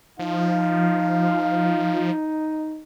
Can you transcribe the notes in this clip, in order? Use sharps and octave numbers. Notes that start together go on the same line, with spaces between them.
F3 D#4 F5